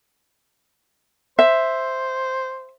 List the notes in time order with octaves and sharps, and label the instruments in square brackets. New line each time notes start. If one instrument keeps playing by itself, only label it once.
[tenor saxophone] C5 [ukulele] E5